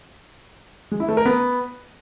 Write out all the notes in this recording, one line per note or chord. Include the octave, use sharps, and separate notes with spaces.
G#3
E4
A3
A#4
B3